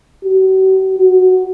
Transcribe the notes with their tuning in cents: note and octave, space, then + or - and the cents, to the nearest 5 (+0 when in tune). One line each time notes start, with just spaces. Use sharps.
F#4 +40
F#4 +0